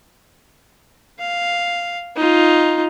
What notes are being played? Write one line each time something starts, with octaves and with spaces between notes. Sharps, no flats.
F5
D#4 F4